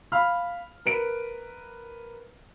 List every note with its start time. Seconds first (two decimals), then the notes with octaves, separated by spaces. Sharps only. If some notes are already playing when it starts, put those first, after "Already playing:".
0.12 F5 B5 F6
0.86 A#4 B4 D7